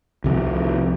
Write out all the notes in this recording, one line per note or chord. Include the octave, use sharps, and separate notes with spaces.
C2 C3 F3